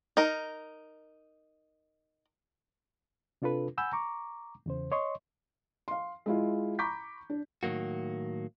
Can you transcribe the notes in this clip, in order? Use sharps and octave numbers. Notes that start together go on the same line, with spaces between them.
D#4 A#4
C3 D4 F4 A4 B4
F#5 G#5 B5 E6 G6
A#5 C#6 D6
E2 C#3 C5
C#5 D#5 C6 C#6
F5 C6
G#3 E4 F4
A#5 B5 C#6 D6 G6 B6
D4
A2 D#3 F#3 A#3 F#4